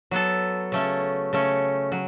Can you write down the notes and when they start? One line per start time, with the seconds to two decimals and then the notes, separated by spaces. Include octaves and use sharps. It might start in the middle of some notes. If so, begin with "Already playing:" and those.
0.11 F#3 B3 A4
0.72 C#3 A3 C#4
1.33 C#3 A3 C#4
1.92 F#3